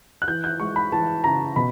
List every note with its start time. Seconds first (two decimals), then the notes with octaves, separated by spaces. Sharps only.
0.22 F#6
0.28 E3 G6
0.44 G6
0.60 G#3 C#6
0.76 B5
0.92 E3 A5
1.24 C#3 A#5
1.56 B2 B5